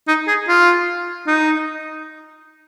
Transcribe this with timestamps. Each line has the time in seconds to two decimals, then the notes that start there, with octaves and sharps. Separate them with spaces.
0.08 D#4
0.28 G#4
0.48 F4
1.27 D#4